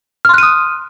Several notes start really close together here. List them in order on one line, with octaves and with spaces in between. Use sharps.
F6 C6 F#6 D#7 D#6